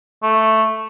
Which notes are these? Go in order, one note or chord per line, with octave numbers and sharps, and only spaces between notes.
A3